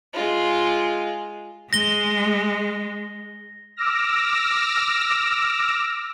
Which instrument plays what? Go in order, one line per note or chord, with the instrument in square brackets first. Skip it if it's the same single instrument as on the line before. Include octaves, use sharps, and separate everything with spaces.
[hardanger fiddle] G#3 F4
[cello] G#3 [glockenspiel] A#6 G7
[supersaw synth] D6 E6 F6 A#6